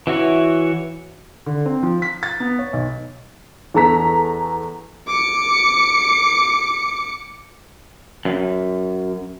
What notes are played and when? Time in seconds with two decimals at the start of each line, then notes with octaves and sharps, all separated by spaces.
0.07 E3 E4 F#4 C#5
1.46 D3
1.66 C4
1.83 F3
2.02 B6
2.23 A6
2.40 B3
2.59 C#5
2.73 B1
3.74 E2 A4 A#5 B6
5.08 D6 C#7
8.25 F#2